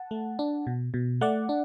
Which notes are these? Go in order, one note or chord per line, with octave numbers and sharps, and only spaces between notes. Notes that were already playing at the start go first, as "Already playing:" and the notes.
Already playing: F#5 A5
A3
D4
B2
B2
A3 D5 F#5
D4